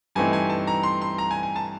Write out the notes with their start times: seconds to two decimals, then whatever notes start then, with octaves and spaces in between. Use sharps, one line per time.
0.15 G2 E3 A3 C4 D#4 G#5
0.33 G#5
0.50 A5
0.67 A#5
0.83 C6
1.02 C6
1.18 A#5
1.31 G#5
1.43 G#5
1.56 A5